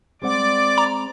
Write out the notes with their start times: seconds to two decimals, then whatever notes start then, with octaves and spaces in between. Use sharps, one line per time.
0.22 G#3 C4 D5 F#5 D6
0.78 A#5